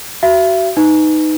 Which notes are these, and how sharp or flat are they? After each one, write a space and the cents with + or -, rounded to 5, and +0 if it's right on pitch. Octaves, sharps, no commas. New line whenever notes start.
F#4 +25 E5 +35
D#4 +0 B4 +25